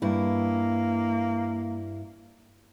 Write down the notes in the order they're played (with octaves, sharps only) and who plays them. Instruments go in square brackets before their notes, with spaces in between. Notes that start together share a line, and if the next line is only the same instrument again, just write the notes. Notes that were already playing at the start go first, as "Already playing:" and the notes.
[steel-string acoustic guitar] G2 E4 [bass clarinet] A#3